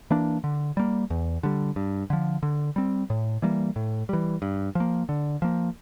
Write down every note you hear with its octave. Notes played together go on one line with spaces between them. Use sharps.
E3 A#3 D4
D3
G3 A#3
E2
D3 G3
G2
D3 F3
D3
G3 C4
A2
E3 G3 A#3
A2
E3 G3
G2
F3 A#3
D3
F3 A#3